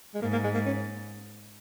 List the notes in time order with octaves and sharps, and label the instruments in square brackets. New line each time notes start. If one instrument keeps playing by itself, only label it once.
[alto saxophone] G#3
[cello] G#2 [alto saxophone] A#3
[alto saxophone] A#3
G#3
A#3
C#4